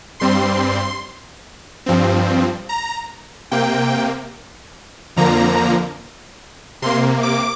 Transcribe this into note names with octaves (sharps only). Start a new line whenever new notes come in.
G2 G3 C4 C6
G2 F3 C4
A#5
C3 A#3 G5
F2 D3 F3 A#3 A#5
C3 A#3 C6
D6